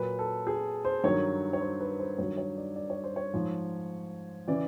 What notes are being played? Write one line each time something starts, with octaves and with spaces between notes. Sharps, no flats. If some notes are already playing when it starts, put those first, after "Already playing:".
Already playing: A#2 F#3 B4
A4
G#4
C5
G2 D#3 F#3 C#5
C#5
C5
B4
C5
G2 D#3 F#3 C#5
C#5
D5
D5
C#5
C5
C#5
G#2 F3
C#3 E3 D5